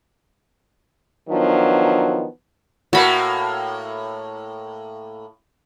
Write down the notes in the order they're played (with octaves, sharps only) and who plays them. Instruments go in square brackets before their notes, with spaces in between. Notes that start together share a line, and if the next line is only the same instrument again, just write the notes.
[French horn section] D#3 F3 F#3 B3 D4
[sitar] A2 A#3 [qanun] F#4 B5